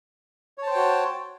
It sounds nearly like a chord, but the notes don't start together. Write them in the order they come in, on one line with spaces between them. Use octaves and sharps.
C#5 A5 C5 G5 F#4